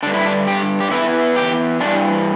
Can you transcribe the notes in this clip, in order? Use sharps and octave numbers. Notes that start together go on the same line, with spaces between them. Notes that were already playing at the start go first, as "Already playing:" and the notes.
G2 D3 D4
E4
D4
G4
G4
E2 E3 E4
G4
G2 E3 D4